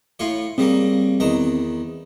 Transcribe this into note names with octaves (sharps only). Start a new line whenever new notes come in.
A2 F4 C#5
C#3 G3 A#3 C4
E2 D#3 A#5